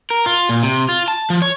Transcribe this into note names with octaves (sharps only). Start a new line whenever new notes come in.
A#4
F4
A#2
C3
F4
A5
F3
C#5